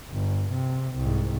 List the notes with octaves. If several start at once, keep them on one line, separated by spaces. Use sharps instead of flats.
G1
C3
C2 G#2